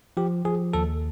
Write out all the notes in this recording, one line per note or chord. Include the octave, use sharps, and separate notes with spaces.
F3 G4
F3 G#4
D#2 A4